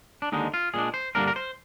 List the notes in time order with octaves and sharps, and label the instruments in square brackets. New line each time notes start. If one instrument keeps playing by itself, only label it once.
[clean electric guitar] D4
D#2 D3 G#3 D#4
F4
A#2 G#3 D4 G#4
C5
G2 D3 G3 A#3 D4 A#4
A#4
C5